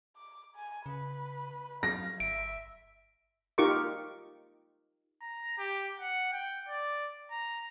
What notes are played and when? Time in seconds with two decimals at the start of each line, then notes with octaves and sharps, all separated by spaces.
0.17 D6
0.55 G#5
0.86 C#3 B4
1.83 F#3 F5 A#6
2.20 G1 E5 D7
3.58 D#4 F4 G4 A#4 C#6 D6
5.21 A#5
5.58 G4
6.00 F#5
6.32 G5
6.69 D5
7.31 A#5